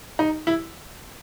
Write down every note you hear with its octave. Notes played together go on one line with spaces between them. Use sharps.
D#4
E4